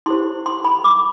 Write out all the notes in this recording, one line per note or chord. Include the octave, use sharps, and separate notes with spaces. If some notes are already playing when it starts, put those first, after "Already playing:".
E4 G4 C5 C6
C6
B5
D6